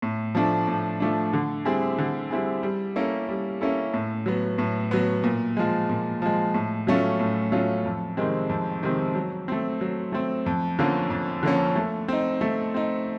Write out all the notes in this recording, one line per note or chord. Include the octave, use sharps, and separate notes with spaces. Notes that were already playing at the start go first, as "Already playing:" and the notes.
A2
F3 A3 D4
A2
F3 A3 D4
D3
G3 C4 E4 G#4
D3
G3 C4 E4 G#4
G3
A#3 C#4 E4 A4
G3
A#3 C#4 E4 A4
A2
F#3 B3
A2
F#3 B3
A#2
F3 G#3
A#2
F3 G#3
A2
F#3 A3 C#4 F4
A2
F#3 A3 C#4 F4
F2
C3 D#3 G#3 C4
F2
C3 D#3 G#3 C4
F#3
A3 C4
F#3
A3 C4
F2
D3 F3 A#3 C#4
F2
D3 F3 A#3 C#4
A3
C4 D#4
A3
C4 D#4